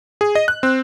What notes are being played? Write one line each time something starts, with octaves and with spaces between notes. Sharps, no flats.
G#4
D#5
F#6
C4